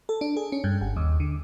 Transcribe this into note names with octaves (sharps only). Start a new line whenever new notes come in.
A4
D4
G#4
C#4
G2
G1
D#2
D3